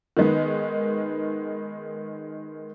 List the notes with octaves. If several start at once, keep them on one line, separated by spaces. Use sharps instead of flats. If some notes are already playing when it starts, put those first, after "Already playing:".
D#3 G#3 B3